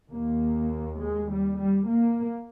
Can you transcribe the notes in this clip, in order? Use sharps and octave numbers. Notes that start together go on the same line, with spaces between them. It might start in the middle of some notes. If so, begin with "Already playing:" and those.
D#2 A#3
G#3
G3
G3
A#3